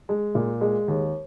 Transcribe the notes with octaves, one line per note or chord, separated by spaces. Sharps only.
G#3
A#2
G#3
D#2